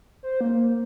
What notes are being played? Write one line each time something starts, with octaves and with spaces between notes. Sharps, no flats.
C5
A#3